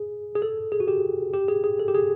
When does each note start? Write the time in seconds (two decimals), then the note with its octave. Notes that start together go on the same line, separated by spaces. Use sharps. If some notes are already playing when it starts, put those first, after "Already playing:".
Already playing: G#4
0.35 G#4
0.42 A4
0.72 G#4
0.80 F#4
0.88 G4
1.33 G4
1.48 G#4
1.64 G#4
1.79 A4
1.88 G4
1.95 G#4